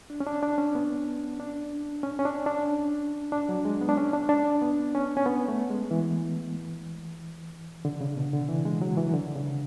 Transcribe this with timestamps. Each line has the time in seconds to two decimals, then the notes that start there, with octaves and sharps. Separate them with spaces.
0.10 D4
0.20 C#4
0.27 D4
0.42 D4
0.58 C#4
0.75 B3
1.40 D4
2.03 C#4
2.19 C#4
2.25 D4
2.46 D4
3.32 D4
3.49 F#3
3.65 G#3
3.81 B3
3.89 D4
3.97 C#4
4.13 D4
4.29 D4
4.62 B3
4.95 C#4
5.17 C#4
5.26 B3
5.48 A3
5.70 G#3
5.91 E3
7.85 D3
8.01 C#3
8.17 B2
8.33 D3
8.49 E3
8.65 G#3
8.82 F#3
8.97 E3
9.14 D3
9.36 C#3